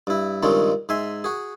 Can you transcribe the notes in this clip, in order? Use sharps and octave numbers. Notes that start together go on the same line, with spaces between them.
G2 E4
C#2 G2 D#3 G#3 C4 C#4
G#2 E5 G#5 C6
F#4 G#4